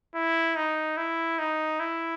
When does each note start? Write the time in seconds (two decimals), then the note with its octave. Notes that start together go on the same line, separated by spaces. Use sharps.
0.15 E4
0.56 D#4
0.98 E4
1.39 D#4
1.80 E4